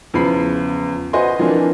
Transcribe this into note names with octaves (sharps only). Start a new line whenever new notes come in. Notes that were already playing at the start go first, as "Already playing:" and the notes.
E2 C#3 F3 B5 C7
F#4 B4 C5 D#5 G#5 C6
E3 F3 A#3 C4 D4